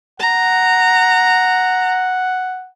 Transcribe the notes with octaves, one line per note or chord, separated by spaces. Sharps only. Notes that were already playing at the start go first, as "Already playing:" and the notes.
F#5 A#5